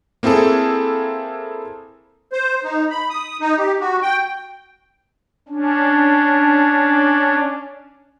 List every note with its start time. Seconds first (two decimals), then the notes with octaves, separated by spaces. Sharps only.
0.23 A#3 C4 E4 G#4 A4
2.32 C5
2.64 D#4
2.90 B5
3.10 D#6
3.41 D#4
3.58 G4
3.80 F#4
4.03 G5
5.49 C#4 D4